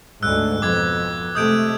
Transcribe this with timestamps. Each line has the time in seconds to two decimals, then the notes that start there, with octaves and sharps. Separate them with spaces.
0.23 D2 G#2 E6 F#6
0.62 F2 B2 D6 G#6
1.35 C3 G#3 A3 D#6 G6 D7